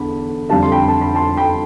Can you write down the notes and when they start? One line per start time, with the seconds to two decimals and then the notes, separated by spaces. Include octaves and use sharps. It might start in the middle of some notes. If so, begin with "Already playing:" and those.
Already playing: E2 D3 B5
0.49 F2 D3 G3 D4 F5 A5
0.63 C6
0.72 G5 B5
0.88 A5
1.01 B5
1.15 A5 C6
1.37 G5 B5